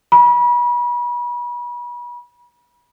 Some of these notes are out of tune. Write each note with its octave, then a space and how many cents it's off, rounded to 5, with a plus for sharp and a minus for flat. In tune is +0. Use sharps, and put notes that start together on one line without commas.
B5 -35